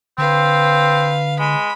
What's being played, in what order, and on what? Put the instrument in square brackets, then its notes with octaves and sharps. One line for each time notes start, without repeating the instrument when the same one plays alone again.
[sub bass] D3 [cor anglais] C4 [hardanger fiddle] B4 F5
[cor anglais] G#3 [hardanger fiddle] B5